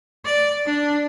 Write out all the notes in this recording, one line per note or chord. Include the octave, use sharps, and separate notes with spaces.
D5
D4